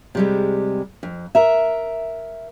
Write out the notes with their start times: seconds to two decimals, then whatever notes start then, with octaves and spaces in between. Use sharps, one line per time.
0.15 C3 G3 G#3
1.03 F2
1.35 A#4 E5